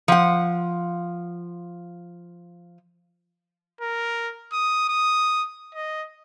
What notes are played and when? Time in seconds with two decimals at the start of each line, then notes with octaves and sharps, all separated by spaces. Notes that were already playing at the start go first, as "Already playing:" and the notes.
0.08 F3 F#5
3.81 A#4
4.52 D#6
4.89 D#6
5.74 D#5